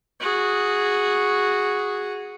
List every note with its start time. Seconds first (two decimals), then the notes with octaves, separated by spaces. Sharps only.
0.20 F#4 G#4